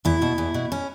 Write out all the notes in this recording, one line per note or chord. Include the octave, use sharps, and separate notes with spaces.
E2 E4
B2
E2
B2
C#4